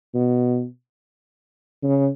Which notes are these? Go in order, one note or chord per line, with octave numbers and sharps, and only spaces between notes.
B2
C#3